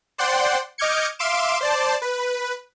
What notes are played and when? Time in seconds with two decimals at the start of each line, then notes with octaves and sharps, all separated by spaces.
0.18 C5 D5 F#5 G5 C6
0.78 D#5 D6 F6 G6 G#6 C#7
1.19 E5 F5 C6 D6 D7 E7
1.61 C5 D5 A5
2.02 B4